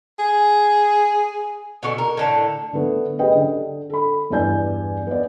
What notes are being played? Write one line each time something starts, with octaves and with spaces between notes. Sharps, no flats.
G#4
B2 D3 F#4 G#5
A#4
A2 D3 A5
D3 A3 B3
C#4 G4 G#4 B4 D#5 G5
D3
A4 B5
E2 G2 D5 G#5 G6
B3 D5